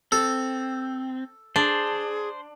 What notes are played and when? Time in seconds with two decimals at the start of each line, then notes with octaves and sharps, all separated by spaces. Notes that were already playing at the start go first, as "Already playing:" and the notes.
0.12 C4 A4
1.56 D4 G#4 C5